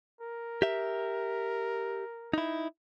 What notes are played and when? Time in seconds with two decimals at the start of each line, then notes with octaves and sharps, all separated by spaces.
0.21 A#4
0.62 G4 E5
2.34 D#4 E4